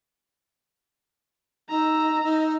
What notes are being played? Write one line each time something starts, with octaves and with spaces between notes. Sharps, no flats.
D#4 A#5 E6
D#4